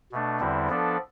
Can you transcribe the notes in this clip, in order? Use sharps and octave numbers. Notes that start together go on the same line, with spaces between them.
B2 A3 D4
E2 D3 G3 C4 E4
F3 B3 D4 A4 D5